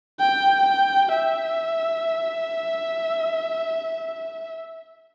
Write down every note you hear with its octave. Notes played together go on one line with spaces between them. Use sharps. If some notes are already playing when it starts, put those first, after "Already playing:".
G5
G5
E5